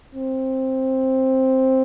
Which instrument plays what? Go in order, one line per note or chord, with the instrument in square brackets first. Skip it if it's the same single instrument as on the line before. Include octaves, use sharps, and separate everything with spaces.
[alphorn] C4